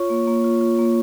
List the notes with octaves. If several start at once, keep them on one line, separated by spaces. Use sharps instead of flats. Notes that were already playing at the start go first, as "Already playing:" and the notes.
Already playing: F4 C#5 C#6
A#3
A#3
F4
F4
A#3